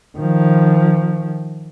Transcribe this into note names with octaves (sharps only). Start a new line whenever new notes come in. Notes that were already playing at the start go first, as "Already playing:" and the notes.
D#3 F3